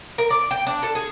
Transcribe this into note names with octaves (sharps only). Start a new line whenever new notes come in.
A#4
D5
G5
D4
A4
G#4